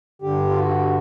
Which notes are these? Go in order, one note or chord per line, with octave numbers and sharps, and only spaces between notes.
G2 D3 G4
F4
F#4